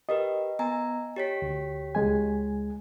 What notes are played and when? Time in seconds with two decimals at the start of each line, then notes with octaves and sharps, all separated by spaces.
0.09 G4 A#4 B4 D#5
0.59 B3 G#5 A#5
1.16 G4 C#5 B6
1.42 D2
1.95 C#2 G#3 G#5